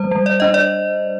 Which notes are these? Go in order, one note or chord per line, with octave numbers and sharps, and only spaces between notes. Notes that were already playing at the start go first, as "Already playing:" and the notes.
Already playing: G3 C5
G3
D5
D4 D#5
D5